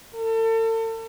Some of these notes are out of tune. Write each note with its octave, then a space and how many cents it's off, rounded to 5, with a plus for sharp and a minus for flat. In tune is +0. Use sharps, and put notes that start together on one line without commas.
A4 +40